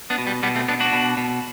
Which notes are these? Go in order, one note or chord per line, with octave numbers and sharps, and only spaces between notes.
B3 D4
B2
G3
B2 G3 B3
A3 C4
B2 B3 D4
D4 F#4
B2
B2